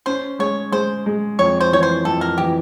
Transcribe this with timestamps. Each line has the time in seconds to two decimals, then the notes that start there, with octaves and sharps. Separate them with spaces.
0.06 C#4 C5
0.39 G#3 C#5
0.72 G#3 C5
1.06 G#3
1.39 F2 C#5
1.61 C5
1.72 E3 C#5
1.83 C5
2.05 F2 A4
2.21 A#4
2.38 E3 G4